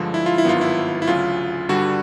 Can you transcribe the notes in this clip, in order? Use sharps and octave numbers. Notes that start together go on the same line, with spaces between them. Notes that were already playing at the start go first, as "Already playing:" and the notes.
Already playing: G2 D3 F3 G#3
E4
F4
E4
G#1 G2 D#3 F#3 B3 F4
E4
E4
D2 C#3 F#3 F4
G2 D3 G3 F#4